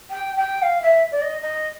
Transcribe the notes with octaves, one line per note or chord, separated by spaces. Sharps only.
G5
G5
F5
E5
D5
D#5
D#5